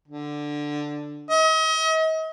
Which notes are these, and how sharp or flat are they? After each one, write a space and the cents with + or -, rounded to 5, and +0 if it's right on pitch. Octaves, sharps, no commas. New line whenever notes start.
D3 +5
D#5 +40